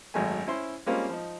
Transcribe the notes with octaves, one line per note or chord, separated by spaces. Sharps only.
G#1 F#2 G#3 A3 G#5
C#4 E4 C5 C6
G3 G#3 A#3 C4 C#4 F4
F3 D#4